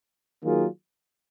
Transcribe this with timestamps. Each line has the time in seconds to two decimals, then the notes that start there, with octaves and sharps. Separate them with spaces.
0.43 D#3 F#3 A#3 F4 G#4